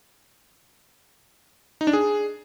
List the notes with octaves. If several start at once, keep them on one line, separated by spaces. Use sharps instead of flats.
D#4
D4
G#4